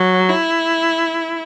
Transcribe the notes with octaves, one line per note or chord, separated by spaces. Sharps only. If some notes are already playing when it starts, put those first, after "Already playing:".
Already playing: F#3
E4